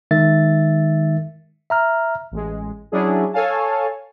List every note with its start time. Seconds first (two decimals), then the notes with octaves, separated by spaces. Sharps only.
0.11 D#3 G#3 E5 A6
1.70 E5 A#5 F6
2.32 A1 G#3
2.92 F#3 C#4 D4 E4 G#4
3.33 A4 C#5 F5 G#5 A5